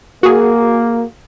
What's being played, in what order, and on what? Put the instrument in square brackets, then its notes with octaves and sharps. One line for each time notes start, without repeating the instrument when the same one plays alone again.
[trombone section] A#3 [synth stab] F#4 G#4